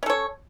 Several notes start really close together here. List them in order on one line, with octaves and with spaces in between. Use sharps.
C#4 A4 C#5